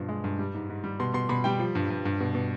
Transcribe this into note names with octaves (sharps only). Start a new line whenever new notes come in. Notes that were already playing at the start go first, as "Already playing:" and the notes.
Already playing: G2 B2 F3
G#3
G2
G3
G#2
G#2
G3
B2 C6
B2 C6
B2 B5
G3 G5
F3
G2
G2
G2
B2
B2